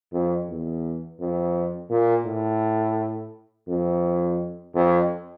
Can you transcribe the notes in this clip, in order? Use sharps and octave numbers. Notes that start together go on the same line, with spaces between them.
F2
E2
F2
A#2
A2
F2
F2